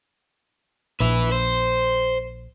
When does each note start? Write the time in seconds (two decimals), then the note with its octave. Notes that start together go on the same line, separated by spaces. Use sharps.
1.00 A#1 B4 E5
1.32 C5